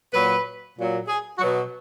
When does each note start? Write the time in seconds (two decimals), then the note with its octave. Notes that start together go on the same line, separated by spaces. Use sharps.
0.12 A#2 F#3 B4
0.76 A#2 F#3
1.07 G#4
1.39 B2 F#3 F#4